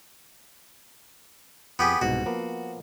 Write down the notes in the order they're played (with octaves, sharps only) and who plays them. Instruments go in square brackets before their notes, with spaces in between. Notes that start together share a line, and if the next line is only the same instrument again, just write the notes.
[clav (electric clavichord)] F2 [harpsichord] B3 G4 G#4
[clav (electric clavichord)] C2 G#2 B2 [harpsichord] F#4
[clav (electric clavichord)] F3 A#3 B3